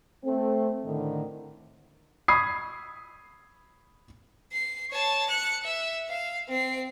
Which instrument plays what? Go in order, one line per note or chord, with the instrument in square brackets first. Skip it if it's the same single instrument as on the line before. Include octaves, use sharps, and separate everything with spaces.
[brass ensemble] A3 C4
A2 D3 D#3
[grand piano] B5 C#6 D#6 E6 G#6 C7
[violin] C7
C#5 A5
F#6 C#7
E5
F5
C4 C7